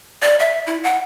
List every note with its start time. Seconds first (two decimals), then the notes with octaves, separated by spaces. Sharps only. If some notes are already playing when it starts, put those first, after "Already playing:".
0.22 D5
0.39 E5
0.67 E4
0.83 F#5